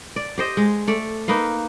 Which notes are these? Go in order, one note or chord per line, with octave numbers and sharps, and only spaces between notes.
D5
G4 C5 D#5
G#3
A3 D5
A#3 D#4 B4 F5